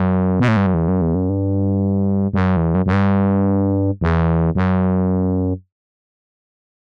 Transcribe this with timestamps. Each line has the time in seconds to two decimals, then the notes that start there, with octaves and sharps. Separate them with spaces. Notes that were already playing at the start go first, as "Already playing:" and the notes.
Already playing: F#2
0.40 B2
0.48 A2
0.57 G2
0.66 F#2
0.74 E2
0.88 F#2
1.01 E2
1.15 F#2
1.29 G2
2.34 G2
2.38 F#2
2.57 E2
2.75 F#2
2.86 F#2
2.93 G2
4.01 E2
4.55 F#2